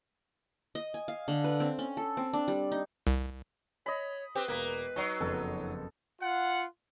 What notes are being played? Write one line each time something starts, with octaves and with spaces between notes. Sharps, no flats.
D#5
G#5
F5
D3
B4
C4
C#4
A4
C4
D4
G3
D#4
C2
C#5 D#5 B5
C4 G4 B4
E1 A#3 A#4 B6
F#3 D#4 A#5 C#6
F#1 F2 B3 A4
F4 F#5